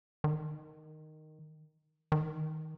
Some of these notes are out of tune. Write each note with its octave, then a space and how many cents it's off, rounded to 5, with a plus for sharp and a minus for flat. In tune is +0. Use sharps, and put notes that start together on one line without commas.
D#3 -5
D#3 +15